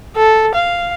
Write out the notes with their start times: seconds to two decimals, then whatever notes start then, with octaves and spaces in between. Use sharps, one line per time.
0.16 A4
0.54 F5